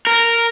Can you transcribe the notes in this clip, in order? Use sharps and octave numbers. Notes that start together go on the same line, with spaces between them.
A#4